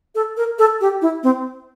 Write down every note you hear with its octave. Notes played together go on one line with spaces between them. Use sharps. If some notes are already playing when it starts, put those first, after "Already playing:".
A4
A#4
A4
G4
E4
C4